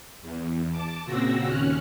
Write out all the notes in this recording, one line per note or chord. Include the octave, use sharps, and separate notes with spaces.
E2
A5 D6
A#2 C#3 C4 F#4 E6 A#6
D#2 C#4 F6 F#6